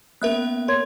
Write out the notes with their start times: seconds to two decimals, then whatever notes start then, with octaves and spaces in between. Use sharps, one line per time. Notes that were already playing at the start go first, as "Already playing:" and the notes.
0.22 A#3 B3 C#4 A#4 E5 F#6
0.68 A#4 C#5 C6 G#6